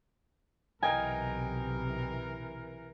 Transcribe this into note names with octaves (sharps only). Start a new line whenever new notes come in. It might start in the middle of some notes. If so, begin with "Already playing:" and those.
B1 C3 E3 A#4 D#5 G5 G#5 A#5